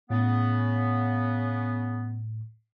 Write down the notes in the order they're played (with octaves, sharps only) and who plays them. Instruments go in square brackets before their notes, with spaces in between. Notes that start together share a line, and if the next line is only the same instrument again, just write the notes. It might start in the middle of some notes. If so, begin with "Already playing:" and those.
[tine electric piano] A2 [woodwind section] C#3 B3